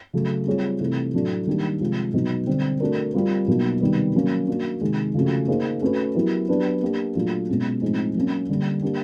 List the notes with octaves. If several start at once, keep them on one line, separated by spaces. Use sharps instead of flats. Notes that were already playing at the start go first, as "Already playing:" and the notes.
C#3 F#3 A3
G3 C4 F4 G#4 C#5
C3 E3 A3
A2 F#3 A3 D4
D#3 G3 A#3 D4 G4
C3 F3 G#3
B2 F#3 B3 D#4
D3 G3 C4
A3 D4 F#4 A#4
G3 C4 F4 A#4
B2 F#3 A#3 D#4 F#4
C3 D#3 G3 B3
F#3 A#3 C#4
A#3 D4 F#4
C3 D#3 G#3
C#3 F3 A3 C#4 F#4
A#3 D#4 G#4 C5
A3 C#4 F#4 B4
F#3 B3 E4 G4 A#4
F#3 B3 D4 G4 B4
A#3 D4 G4
A#2 F#3 A3 D4 F4
B2 G#3 C#4
A2 F3 G#3 C4 D#4
F#3 A#3 C#4
D3 G3 A#3
A#3 D4 G4